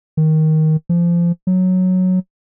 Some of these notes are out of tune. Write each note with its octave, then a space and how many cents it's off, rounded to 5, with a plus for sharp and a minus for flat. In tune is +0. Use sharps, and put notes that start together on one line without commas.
D#3 +10
F3 -25
F#3 -5